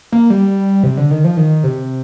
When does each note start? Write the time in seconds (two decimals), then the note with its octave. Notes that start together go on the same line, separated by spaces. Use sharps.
0.12 A#3
0.30 G3
0.83 C3
0.97 D3
1.11 D#3
1.24 F3
1.37 D#3
1.64 C3